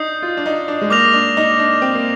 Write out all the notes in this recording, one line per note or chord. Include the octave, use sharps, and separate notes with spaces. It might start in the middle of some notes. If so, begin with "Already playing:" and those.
Already playing: D4 D#4 D#6 G6 C7
F4
D4
D#4
D4
G#3
A#3 D6 F6 A#6 F7
D4
D#4
D4
C4
A#3